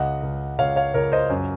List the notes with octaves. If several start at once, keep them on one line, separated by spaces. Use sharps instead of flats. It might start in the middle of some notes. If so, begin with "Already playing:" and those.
Already playing: C#2 D#5 F#5
C#2
C#2 C#5 F5
C#5 F5
C#2 A#4 C#5
C5 D#5
F#2